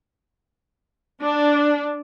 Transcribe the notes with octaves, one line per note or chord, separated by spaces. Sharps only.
D4